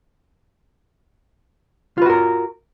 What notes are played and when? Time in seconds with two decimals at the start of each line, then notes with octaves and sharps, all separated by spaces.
1.98 F4
2.02 B4
2.06 F#4
2.10 A#4